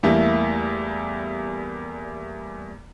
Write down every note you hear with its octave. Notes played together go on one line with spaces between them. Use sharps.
E2 G3 A3 A#3 E4